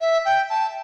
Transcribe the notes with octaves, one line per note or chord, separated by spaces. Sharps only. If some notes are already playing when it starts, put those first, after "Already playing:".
E5
G5
A5